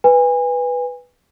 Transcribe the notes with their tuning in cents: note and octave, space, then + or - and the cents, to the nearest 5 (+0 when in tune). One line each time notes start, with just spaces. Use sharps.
B4 +0 G#5 -30